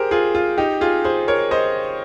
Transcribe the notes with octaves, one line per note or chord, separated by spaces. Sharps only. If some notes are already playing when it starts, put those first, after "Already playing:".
Already playing: G4 G#4 A#4 C5
F4 G#4
F4
D#4 G4
F4 G#4
G#4 C5
A#4 C#5
C5 D#5